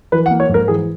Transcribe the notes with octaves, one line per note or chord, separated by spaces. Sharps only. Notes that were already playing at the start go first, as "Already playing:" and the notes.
E3 B4
F#5
A#3
C#5
G#2
A#4
E3 G#4